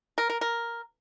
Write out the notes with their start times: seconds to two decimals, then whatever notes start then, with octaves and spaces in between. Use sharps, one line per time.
0.18 A#4
0.30 A#4
0.41 A#4